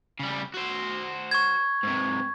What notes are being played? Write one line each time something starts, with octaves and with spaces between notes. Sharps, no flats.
C#3 G3
F#4 C5
C#6 G#6
G#2 C3